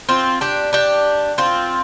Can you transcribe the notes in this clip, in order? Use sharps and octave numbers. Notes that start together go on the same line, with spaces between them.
C4 F4
D4 G4
D4 G4
C4 F4